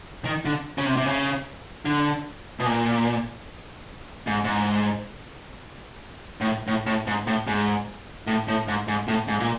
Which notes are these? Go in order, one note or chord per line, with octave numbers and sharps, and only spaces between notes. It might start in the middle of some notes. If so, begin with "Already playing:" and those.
D#3
D3
C#3
C3
C3
C#3
D3
B2
A#2
G#2
G#2
A2
A2
A2
G#2
A2
G#2
A2
A2
G#2
G#2
A2
G#2
A#2